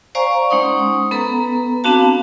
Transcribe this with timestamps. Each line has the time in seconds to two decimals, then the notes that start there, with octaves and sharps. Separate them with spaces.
0.15 C5 D5 F5 G#5 A#5 C#6
0.50 G#3 C#4 D#4 F#5 C6 D#6
1.11 B3 A4 B4 A#5
1.84 B3 C4 D4 F#4 F5 A5